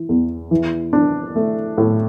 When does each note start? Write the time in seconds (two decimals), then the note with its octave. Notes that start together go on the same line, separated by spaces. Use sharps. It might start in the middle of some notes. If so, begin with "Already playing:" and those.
Already playing: E3
0.09 E2
0.51 E3
0.93 D4
1.36 A3
1.78 A2